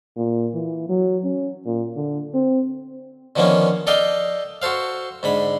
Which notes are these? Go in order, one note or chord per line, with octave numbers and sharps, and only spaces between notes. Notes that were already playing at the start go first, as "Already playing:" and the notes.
A#2
E3
F#3
C#4
A#2
D3
C4
D3 D#3 F3 A#3 B3 C#4
A4 D5 D#5 F5 G5
F#4 A4 C5 F5
G#2 D3 B5